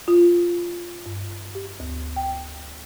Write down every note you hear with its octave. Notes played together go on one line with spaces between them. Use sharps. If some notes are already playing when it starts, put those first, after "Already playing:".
F4
G2
G4
D2
G5